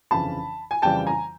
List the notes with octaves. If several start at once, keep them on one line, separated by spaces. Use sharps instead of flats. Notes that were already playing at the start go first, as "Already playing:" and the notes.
G1 F2 C#3 E3 A5 B5
G#5
F2 C#3 E3 G3 G5 A5
G#5 A#5